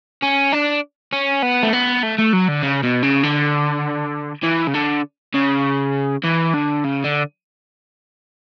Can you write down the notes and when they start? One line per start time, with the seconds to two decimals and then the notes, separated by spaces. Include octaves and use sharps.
0.23 C#4
0.53 D4
1.12 C#4
1.42 B3
1.63 A3
1.73 B3
2.03 A3
2.18 A3
2.33 F#3
2.48 D3
2.63 C#3
2.83 B2
3.03 C#3
3.23 D3
4.43 E3
4.67 C#3
4.74 D3
5.34 C#3
6.24 E3
6.54 D3
6.84 C#3
7.04 D3